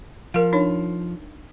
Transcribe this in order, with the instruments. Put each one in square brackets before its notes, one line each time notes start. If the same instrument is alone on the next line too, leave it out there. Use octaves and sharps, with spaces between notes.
[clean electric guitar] F3 [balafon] A#4 F5
[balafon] D4 D#4 C#5